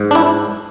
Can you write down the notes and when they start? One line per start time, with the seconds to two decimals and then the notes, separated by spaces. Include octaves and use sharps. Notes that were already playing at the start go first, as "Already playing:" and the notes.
Already playing: G#2
0.11 D4
0.15 E4